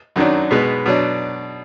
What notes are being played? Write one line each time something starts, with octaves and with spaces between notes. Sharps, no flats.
F#2 D#3 F#3 D4
B2 G#3 B3
B2 F#3 D4